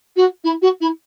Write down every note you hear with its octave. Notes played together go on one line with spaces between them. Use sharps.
F#4
E4
F#4
E4